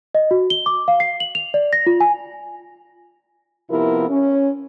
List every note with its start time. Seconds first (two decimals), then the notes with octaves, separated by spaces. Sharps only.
0.15 D#5
0.31 F#4
0.50 G7
0.66 D6
0.88 F5
1.00 C7
1.20 F#7
1.35 F7
1.54 D5
1.73 A#6
1.86 F4
2.01 G#5
3.70 C3 F3 B3 E4 A#4
4.09 C#4